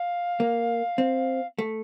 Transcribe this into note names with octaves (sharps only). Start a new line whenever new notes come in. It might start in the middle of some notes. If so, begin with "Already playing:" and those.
Already playing: F5
A#3
C4
A3